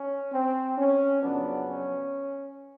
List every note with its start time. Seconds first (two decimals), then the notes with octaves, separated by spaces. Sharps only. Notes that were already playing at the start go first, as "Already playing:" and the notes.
Already playing: C#4
0.33 C4
0.78 C#4
1.22 F2 C#3 F#3 B3 D4
1.67 C#4